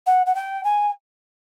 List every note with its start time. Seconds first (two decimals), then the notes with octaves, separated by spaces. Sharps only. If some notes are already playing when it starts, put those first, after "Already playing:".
0.06 F#5
0.26 F#5
0.35 G5
0.64 G#5